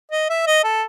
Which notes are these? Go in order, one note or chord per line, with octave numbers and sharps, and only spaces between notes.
D#5
E5
D#5
A4